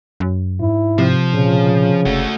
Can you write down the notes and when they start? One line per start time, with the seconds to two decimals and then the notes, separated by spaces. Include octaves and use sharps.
0.20 F#2
0.60 G#2 E4
0.98 C3 F3
1.34 A#2 C#3
2.05 F#1 A3 F#4